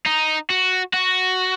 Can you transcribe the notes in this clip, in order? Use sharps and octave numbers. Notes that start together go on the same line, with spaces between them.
D#4
F#4
F#4